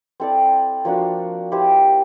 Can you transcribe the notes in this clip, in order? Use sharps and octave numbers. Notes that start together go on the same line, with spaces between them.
C4 E4 A4 D5
F3 A#3 D4 F#4
E4 G4 C5